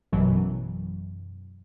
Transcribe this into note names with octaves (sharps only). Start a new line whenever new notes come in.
A1 F#2 B2 E3 F#3